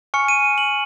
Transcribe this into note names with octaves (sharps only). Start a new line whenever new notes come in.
G#5 C#6 F6 C#7
D#7
F#7